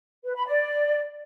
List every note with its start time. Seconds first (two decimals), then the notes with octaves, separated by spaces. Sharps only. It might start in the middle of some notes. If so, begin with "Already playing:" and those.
0.24 B4
0.35 B5
0.47 D5